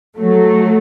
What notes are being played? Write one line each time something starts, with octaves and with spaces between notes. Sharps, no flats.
F#3 A3